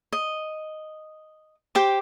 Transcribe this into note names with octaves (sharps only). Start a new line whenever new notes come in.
D#5
G4 C5 D6